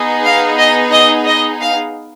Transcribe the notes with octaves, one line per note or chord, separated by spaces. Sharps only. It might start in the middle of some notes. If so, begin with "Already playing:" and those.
Already playing: B3 D#4 G#4
F5
D#5
D#5
D#5
F5